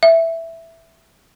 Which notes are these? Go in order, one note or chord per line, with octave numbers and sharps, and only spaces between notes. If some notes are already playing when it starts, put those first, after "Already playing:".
E5